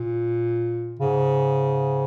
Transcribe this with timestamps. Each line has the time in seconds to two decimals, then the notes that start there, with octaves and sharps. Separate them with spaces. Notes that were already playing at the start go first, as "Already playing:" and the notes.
Already playing: A#2
0.97 G#2 C#3